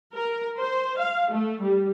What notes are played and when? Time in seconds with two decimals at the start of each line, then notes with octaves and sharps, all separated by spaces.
0.14 A#4
0.58 C5
0.99 F5
1.31 A3
1.62 G3